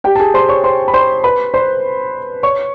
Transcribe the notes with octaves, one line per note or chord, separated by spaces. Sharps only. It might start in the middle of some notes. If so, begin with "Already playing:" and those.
G4 G5
A5
G#4 G#5
C5 C6
C#5 C#6
C5 C6
B5
C5 C6
B4 B5
C5 C6
C#5 C#6